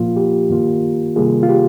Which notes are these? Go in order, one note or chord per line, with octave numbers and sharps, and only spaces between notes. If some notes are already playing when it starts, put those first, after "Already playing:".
Already playing: A#2 F3 A#3 F4
G4
G2 D#3 A#3 F4
C3 D#3 G3 A#3 F4 G#4
F4
G4